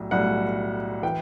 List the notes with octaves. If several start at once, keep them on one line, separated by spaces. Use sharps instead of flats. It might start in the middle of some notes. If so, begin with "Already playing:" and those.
Already playing: B1 A2 G3
B1 A2 G3 F#5
E3 G5